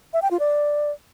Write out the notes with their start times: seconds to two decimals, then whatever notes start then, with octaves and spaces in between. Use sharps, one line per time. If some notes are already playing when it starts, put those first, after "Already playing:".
0.13 E5
0.22 G5
0.31 F4
0.39 D5